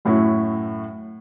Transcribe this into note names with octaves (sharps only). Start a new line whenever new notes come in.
F#2 A2 A3 E4 F#4